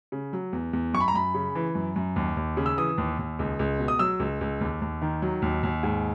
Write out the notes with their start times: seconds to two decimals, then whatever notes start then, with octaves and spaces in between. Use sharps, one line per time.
0.12 C#3
0.33 F#3
0.53 E2
0.73 E2
0.93 F#2 C#6
1.00 B5
1.08 A#5
1.14 F#2 B5
1.34 C#3
1.55 E3
1.75 F#2
1.96 F#2
2.16 D#2
2.37 D#2
2.57 C#3
2.66 E6
2.77 E3 D#6
2.98 D#2
3.19 D#2
3.39 C#2
3.59 C#2
3.79 B2
3.88 D#6
3.99 F#3 E6
4.20 C#2
4.41 C#2
4.61 D#2
4.82 D#2
5.02 D#3
5.22 F#3
5.42 D#2
5.63 D#2
5.83 G#2